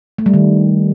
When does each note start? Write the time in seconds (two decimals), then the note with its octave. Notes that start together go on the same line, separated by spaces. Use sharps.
0.19 A3
0.26 G3
0.34 D#3